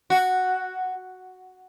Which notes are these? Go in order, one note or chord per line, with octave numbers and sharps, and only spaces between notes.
F#4